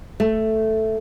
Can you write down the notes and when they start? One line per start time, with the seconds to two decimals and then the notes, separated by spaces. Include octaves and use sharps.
0.20 A3